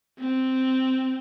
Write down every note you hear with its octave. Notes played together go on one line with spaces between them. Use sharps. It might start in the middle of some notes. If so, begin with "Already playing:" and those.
C4